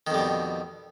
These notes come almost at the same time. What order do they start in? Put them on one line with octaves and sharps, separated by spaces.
D#3 F2 G3 B2